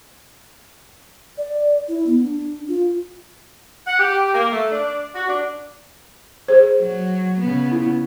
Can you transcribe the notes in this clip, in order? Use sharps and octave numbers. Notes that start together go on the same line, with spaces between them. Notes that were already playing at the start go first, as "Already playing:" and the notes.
D5
E4
B3
D4
F4
F#5
G4
A#3
A3
D4
F#4
D4
G#4 C5
F#3
C#3 B3
E4